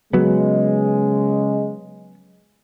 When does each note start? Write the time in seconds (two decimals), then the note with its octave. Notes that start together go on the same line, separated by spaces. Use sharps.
0.13 C#3 F#3 G#3 B3